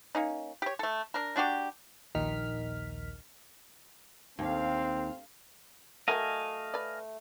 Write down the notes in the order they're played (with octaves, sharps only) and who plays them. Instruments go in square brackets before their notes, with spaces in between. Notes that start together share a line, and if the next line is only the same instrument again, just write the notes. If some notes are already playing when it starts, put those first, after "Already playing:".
[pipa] A#3 C#4 D#4
G4 C#5
A3 A4
D4 A#4
G3 D4 F#4 G4
[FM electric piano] A#1 D#2 D#3 D#4 F6 B6
[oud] D#2 [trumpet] C4 [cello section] A4 F5
[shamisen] F#3 A#4 F#5 [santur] A3 [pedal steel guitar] D#5 F5 G#5
[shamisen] B4 D5